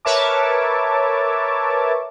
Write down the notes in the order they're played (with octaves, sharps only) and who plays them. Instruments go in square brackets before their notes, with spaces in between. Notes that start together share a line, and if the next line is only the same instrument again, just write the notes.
[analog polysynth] A#4 B4 C#5 E5 A5 D6